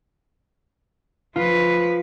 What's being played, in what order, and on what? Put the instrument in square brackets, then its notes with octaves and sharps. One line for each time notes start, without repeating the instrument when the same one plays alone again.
[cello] F3 B4 [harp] F4